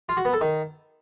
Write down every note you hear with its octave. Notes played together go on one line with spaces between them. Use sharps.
F4
F#4
B3
A4
D#3